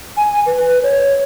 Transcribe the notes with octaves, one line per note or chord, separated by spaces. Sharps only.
G#5
B4
C#5